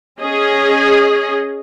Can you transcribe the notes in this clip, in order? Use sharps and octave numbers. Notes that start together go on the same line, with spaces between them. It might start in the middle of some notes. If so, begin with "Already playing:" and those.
C#4 G#4 D#5